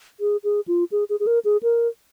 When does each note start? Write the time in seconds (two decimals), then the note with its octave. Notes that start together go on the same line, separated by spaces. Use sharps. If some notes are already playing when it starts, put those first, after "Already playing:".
0.20 G#4
0.44 G#4
0.68 F4
0.92 G#4
1.09 G#4
1.20 G#4
1.27 A#4
1.45 G#4
1.63 A#4